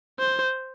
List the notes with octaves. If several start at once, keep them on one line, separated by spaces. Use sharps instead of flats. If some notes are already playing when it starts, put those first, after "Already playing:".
C5